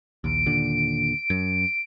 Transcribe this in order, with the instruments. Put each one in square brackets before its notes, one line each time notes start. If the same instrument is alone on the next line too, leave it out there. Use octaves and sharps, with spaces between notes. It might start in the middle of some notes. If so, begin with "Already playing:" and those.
[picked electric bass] A#1 D#2 [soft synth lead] D7
[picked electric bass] D#2 A#2 D3
F#2